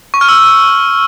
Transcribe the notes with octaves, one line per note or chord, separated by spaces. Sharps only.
C#6
F6
E6